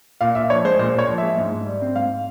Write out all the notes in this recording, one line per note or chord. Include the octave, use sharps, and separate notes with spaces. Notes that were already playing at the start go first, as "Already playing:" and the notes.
A#2 F5
A#2 E5
F3 C#5
G#3 C5
A#2 C5
A#2 C#5
F3
G#3 E5
G#2
G#2
G3
C4
G#2 F5